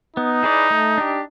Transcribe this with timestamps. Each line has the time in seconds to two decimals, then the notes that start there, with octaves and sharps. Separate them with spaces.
0.16 B3 D#4
0.43 E4 G#4 B4 D5
0.71 A3
0.98 D4 G4